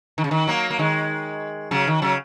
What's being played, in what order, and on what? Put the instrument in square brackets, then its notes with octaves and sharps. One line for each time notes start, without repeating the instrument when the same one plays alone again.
[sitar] D#3
C#3
D#3
F#3 A#3
A#3
D#3 G#3
C#3 F#3
D#3
C#3 F#3